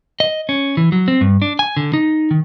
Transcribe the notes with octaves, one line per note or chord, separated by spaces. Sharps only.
D#5
C#4
E3
F#3
C4
G2
D4
G#5
D3
D#4
D#3